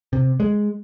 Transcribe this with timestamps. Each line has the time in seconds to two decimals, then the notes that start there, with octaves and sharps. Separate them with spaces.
0.13 C3
0.40 G#3